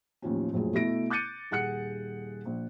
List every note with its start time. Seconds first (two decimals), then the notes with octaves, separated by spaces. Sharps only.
0.22 A1 D#2 F3 C#4
0.53 A#1 F#2 A2 F3 G#4
0.73 B2 A3 E4 A#6 D7
1.10 D6 F#6 G6 A6 C#7 D#7
1.51 D#1 G#4 F#5 F#6 C#7
2.45 A#1